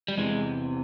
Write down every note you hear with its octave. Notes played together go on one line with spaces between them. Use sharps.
G3
E2 C3 E3 G#3